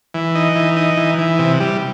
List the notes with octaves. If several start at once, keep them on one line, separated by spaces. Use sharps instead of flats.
E3
D#4
E3
D#4
E3
E3
C3
G3